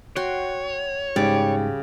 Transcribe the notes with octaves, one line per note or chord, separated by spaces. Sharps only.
F#4 C#5 G5 C6
G#2 C#3 G3 D5